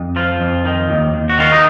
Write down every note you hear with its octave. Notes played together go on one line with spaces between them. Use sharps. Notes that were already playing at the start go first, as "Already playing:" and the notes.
Already playing: F2
F3 F4
F2
D#3
D#2
D#2
F#4
D#3 F4
D#4